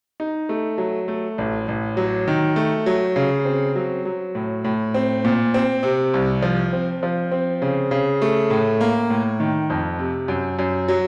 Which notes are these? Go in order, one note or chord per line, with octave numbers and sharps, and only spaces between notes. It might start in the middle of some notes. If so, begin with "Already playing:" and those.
D#4
A3
F#3
A3
A1
A1
F#3
D#3
A3
F#3
C#3
C4
F#3
F#3
A2
A2
C4
A#2
C4
C3
C2
F3
C4
F3
C4
C#3
C#3
A3
A2
A#3
A2
D#3
F2
C3
F#2
F#2
F#3